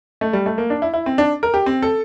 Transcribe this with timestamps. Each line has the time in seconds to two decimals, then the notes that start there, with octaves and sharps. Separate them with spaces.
0.21 A3
0.33 G3
0.46 A3
0.58 A#3
0.70 D4
0.82 E4
0.94 E4
1.06 C4
1.18 D4
1.43 A#4
1.54 G4
1.66 C4
1.82 A4